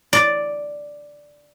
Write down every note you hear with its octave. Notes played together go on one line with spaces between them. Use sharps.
D5